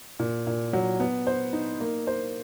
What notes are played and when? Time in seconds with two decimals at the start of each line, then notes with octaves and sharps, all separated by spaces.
0.19 A#2
0.47 A#2
0.73 F#3
1.00 B3
1.27 C5
1.53 D#4
1.80 A#3
2.07 C5